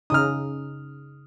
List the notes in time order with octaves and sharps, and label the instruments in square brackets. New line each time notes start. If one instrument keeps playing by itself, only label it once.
[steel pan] C#3 D#4 [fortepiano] D#6 F6